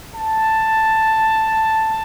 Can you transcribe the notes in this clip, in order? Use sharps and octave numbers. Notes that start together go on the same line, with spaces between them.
A5